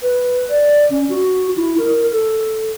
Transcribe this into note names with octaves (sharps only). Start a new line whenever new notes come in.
B4
D5
C#4
F#4
E4
A#4
A4